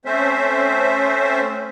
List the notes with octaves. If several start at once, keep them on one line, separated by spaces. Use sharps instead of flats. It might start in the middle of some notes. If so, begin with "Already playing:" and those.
A3 C4 C#4 C5 E5